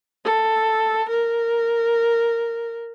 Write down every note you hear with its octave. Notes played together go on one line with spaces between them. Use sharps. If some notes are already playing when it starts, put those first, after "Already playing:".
A4
A#4